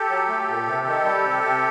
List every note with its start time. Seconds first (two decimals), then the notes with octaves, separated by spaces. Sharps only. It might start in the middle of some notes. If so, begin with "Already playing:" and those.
Already playing: G4 A4
0.10 F#3
0.28 A3
0.48 A#2
0.66 C3
0.86 D#3
1.04 G3
1.24 C3
1.43 C3